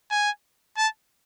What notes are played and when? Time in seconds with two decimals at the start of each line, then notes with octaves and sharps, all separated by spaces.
0.10 G#5
0.78 A5